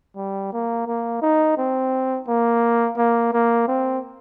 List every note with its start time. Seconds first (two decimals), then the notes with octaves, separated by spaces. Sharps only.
0.16 G3
0.53 A#3
0.87 A#3
1.22 D#4
1.57 C4
2.28 A#3
2.97 A#3
3.33 A#3
3.68 C4